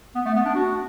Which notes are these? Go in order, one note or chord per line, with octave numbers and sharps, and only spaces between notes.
B3
A3
B3
D4
F#4